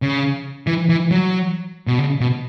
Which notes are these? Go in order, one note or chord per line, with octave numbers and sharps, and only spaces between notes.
C#3
E3
E3
F#3
B2
C#3
B2